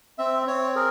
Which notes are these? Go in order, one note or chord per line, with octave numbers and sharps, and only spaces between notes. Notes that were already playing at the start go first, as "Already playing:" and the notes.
C4 E5
C4 C#5
G#4 A#4